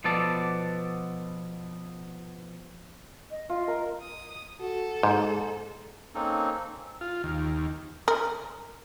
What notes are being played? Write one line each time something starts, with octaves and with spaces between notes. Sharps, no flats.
B2 F3 B3 A4 D5 A5
D#5
F4
A#4
D#6
F#4 A4
G#2 G#3
A#3 C4 C#4 D#4 A4
F4
D#2
A#4